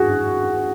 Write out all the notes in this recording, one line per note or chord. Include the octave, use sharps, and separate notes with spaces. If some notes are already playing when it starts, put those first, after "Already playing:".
Already playing: F#4 G#4